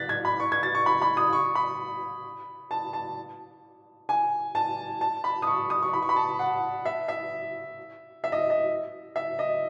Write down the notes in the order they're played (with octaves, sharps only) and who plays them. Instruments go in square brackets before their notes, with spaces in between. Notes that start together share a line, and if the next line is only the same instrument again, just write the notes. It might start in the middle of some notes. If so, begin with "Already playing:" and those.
Already playing: [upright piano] F#6 A6 B6
G#6
B5
C#6
G#6
A6
C#6
B5
B5
D#6
C#6
B5
A5
A5
G#5
A5
A5
B5
D#6
C#6
D#6
C#6
B5
C#6
B5
A5
F#5
E5
E5
E5
D#5
D#5
E5
D#5